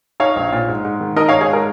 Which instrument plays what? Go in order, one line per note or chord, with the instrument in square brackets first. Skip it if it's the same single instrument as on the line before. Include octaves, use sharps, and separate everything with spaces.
[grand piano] D#4 C#5 F5
A#1
A#2
G#2
G#2
D#3
D#4 A#4 D#5
C#5 F5
G#2
G#4 C#5
G#3 A#4